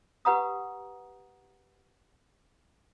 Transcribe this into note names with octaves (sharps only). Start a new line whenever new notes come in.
G4 B4 F#5 A#5 D#6